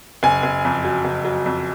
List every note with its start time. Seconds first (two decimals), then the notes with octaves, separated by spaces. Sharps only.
0.23 F#1 G#5
0.43 F#1
0.65 F2
0.84 F#3
1.05 F#1
1.25 F#3
1.46 F2